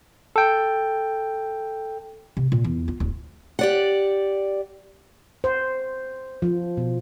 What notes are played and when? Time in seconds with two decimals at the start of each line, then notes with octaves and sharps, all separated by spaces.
0.36 A4 G5
2.37 C3
2.52 A#2
2.64 E2
2.88 F4
3.00 D1
3.59 G4 D5 F#5
5.44 C5
6.42 F3
6.77 B2